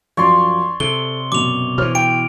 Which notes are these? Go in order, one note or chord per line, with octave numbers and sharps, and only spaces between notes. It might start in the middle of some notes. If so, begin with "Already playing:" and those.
F#2 F3 C#5 D5 C6
C3 A4 G7
F#2 B2 D6 F7
B2 E3 C5 C#5 F6
G5 D7